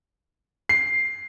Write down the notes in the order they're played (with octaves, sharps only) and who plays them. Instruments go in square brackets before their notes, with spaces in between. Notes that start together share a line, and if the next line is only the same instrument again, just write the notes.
[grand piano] C7